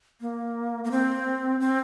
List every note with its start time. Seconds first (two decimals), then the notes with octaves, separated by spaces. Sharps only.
0.21 A#3
0.84 A#3
0.91 C4
1.60 C4